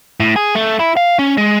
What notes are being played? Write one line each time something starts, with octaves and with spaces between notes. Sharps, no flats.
A2
G#4
A3
E4
F5
C#4
G#3